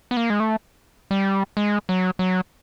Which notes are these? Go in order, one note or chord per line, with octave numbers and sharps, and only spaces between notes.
B3
A#3
G#3
A3
G3
G#3
F#3
F#3